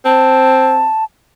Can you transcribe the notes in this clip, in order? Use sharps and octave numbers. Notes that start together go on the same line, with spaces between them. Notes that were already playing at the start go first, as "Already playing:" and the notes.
C4 A5